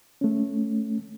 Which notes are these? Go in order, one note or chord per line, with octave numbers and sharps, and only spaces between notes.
A3 C#4